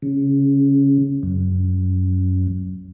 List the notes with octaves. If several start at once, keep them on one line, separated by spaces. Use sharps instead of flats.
C#3
F#2